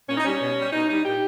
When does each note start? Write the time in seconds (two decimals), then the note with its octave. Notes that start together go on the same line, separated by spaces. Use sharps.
0.09 A#2 C#4
0.17 D#4
0.24 G3 C#4
0.41 B2
0.57 G3
0.73 B2 D#4
0.89 G3 D#4
1.05 A#2 G4